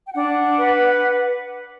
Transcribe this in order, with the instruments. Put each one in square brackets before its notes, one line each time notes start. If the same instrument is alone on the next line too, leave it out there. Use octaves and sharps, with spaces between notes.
[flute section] G5
D4 F#5
B4